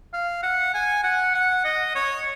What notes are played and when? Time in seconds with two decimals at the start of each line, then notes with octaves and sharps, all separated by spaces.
0.13 F5
0.43 F#5
0.74 G#5
1.04 F#5
1.35 F#5
1.65 D#5
1.95 C#5